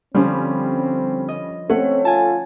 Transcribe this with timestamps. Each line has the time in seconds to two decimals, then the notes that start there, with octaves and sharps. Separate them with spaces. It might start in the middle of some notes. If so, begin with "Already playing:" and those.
0.14 D3 F3 G3 C4 C#4
1.28 D#5
1.69 A3 C4 C#4 F#5
2.05 F4 G#5 A5